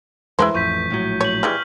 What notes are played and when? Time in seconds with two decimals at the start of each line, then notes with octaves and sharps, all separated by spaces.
0.39 E2 G#3 E4 B4 C5
0.54 A1 F2 C#6 G6 B6
0.90 A#1 A2 F#3
1.21 C#5 G6 F#7
1.43 E3 G3 G#3 F6